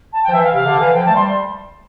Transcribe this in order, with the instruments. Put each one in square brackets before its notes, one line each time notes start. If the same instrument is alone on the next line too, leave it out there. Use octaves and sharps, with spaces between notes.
[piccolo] A5
G5
[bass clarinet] F3
[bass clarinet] E3 [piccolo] E5
[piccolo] F5
[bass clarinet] C3 [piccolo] F5
[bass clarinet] D3
E3
[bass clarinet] F3 [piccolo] G5
[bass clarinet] A3 [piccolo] A5
[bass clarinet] G3 [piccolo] C6